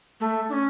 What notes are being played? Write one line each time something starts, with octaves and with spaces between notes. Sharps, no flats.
A3
D4
C#4